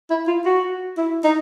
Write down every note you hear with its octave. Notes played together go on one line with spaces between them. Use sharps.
E4
F4
F#4
E4
D#4